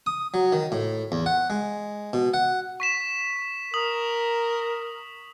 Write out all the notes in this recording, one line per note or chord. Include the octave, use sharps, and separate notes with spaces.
D#6
F#3
D#3
A2
E2
F#5
G#3
B2
F#5
C#6 B6 E7
A#4 D#6 F#7